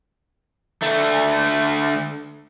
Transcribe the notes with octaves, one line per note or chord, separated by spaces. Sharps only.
D2 A3